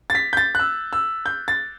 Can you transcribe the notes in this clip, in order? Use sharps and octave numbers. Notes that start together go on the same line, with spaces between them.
A6
B6
G6
A6
F#6
E6
E6
G6
A6